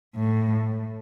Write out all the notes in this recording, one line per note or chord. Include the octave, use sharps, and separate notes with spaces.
A2